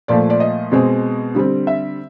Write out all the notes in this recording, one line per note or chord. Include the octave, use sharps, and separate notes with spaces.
A#2 F3 A3 D5
D5
D#5
B2 G#3 C4
D3 G3 C4
E5